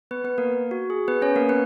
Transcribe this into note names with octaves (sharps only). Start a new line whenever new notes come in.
B3 B4
B3 B4
A#3 A#4
F#4
G#4
B3 B4
C#4 C#5
A#3 A#4
B3 B4